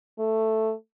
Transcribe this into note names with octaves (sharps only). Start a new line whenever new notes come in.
A3